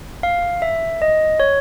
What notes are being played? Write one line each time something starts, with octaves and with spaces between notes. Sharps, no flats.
F5
E5
D#5
C#5